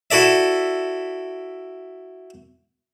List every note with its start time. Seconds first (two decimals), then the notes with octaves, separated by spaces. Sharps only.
0.11 E4 F#4 A4 D5 E5